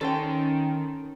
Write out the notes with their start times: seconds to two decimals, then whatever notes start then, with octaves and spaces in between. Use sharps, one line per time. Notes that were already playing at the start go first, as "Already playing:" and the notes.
0.01 D#3 C#4 A4 C5 G5